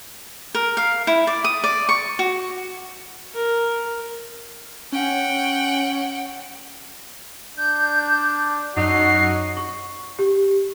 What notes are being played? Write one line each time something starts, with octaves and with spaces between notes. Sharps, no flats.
A#4
F5
E4
D5
D#6
D5
C#6
F#4
A#4
C#4 F#5 G5
D4 G6
F#2 F#3 D#4 F#4 C7
C#6
G4